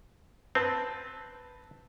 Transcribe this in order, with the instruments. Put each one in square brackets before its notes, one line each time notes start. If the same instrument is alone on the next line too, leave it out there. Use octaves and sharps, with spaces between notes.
[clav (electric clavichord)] C4 [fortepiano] B4 A5